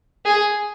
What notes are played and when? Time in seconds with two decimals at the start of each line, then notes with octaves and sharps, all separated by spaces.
0.25 G#4